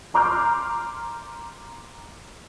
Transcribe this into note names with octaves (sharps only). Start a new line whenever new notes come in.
A#5 C6 D6 F6 G6